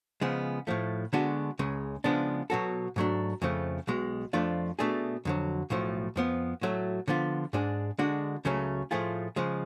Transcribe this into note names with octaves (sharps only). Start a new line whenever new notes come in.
C#3 F3 G#3 B3
A2 F3 A3
D3 G#3 B3 D4 F#4
C#2 C#3 G#3
C#3 F3 G#3 B3 D4
B2 F#3 B3 F#4 A4
G#2 F#3 A3 D4
F2 C#3 F3 A3
B1 B2 G#3
F2 F3 A3 D4 F4
B2 A3 D4 G#4
F2 D3 F#3
B1 A2 F3 A3
F2 F3 B3
A2 F#3 A3
D3 F3 B3 F4
G#2 G#3 D4 G#4
D3 G#3 D4 F#4
C#2 C#3 F#3 A3 C#4
A2 F3 A3 F4 G#4
C#3 F3 G#3